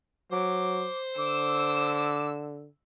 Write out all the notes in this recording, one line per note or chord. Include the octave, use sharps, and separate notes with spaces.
F#3 C5 D6
D3 D6 E6